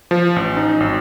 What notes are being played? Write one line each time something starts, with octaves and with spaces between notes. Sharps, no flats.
F3
A1
D#4
G#1